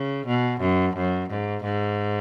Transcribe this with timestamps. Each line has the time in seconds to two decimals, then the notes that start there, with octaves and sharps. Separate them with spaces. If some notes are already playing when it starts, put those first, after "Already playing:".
Already playing: C#3
0.27 B2
0.61 F#2
0.96 F#2
1.30 G#2
1.64 G#2